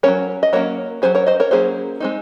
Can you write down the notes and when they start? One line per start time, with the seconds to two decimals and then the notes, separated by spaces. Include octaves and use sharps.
0.03 F#3 A#3 C#4 A#4 C#5
0.43 D#5
0.53 F#3 A#3 C#4 A#4 C#5
1.02 F#3 A#3 C#4 G#4 C5
1.15 A#4 C#5
1.27 C5 D#5
1.40 A#4 C#5
1.51 F#3 A#3 C#4 G#4 C5
2.00 G#3 C4 D#4